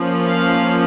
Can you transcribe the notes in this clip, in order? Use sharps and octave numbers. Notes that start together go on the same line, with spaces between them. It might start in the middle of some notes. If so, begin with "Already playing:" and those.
Already playing: F3 A#3 C#4
F5